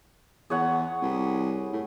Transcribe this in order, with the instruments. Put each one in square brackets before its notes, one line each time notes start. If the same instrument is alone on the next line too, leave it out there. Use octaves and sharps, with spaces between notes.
[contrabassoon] E2 [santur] G#4 C#5 F#5
[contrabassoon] C2
A2